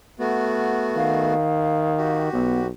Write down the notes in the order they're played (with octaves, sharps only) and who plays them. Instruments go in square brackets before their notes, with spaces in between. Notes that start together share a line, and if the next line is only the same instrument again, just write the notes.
[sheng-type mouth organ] A3 B3 F#4
[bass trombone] D#3 [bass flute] F5
[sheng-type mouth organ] F#4 G4
[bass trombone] B1 [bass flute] B3